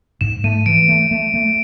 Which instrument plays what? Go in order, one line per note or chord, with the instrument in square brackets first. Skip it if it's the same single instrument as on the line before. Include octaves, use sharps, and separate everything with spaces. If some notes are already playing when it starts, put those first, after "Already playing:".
[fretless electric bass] G#2 [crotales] E7
[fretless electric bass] A3 [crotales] D#7
[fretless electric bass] E3 [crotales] D7
[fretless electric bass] A3
A3
A3